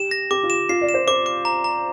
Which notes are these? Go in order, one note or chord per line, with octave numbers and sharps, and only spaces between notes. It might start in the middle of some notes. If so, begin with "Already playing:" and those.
Already playing: G4 E7
A#6
G4 D6
F4
E7
F4 C7
D5
E7
C5
C5 D6
D6
A#5
A#5